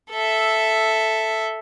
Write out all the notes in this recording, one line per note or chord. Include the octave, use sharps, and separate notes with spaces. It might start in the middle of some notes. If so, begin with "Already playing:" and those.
A4 E5